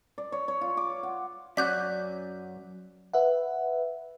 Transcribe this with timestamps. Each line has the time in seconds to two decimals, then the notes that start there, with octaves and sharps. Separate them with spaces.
0.18 D5
0.32 C#5
0.48 C#5
0.61 F4
0.77 D6
1.03 F#5
1.57 F#2 C#4 F#4 D5 F#6 G6 B6
3.14 B4 E5 F#5